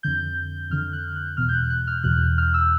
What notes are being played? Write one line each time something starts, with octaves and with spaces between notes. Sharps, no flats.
F2 D3 G6
F2 D3 F6
F#6
F#6
E2 B2 F6
G6
F#6
F#6
F6
E2 B2 F#6
F6
E6